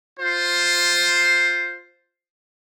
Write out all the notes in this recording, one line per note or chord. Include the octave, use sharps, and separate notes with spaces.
F4 C5